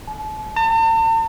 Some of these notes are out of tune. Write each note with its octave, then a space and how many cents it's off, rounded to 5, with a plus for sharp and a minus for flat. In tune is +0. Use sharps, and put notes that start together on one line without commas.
A5 -35
A5 +45